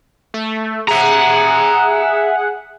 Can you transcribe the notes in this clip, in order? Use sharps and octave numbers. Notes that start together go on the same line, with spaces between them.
A3
G#4 E5 F#5 A#5